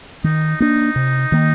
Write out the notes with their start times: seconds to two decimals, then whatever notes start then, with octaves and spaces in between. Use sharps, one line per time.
0.24 D#3 D#4
0.60 A#3 D4 D#4
0.96 C3
1.32 D#3 A#3